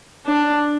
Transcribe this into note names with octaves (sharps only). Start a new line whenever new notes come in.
D4